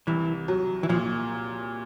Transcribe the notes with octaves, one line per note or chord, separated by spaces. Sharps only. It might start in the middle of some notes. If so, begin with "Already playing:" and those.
C2 E3
F#3
E3
A#2 F3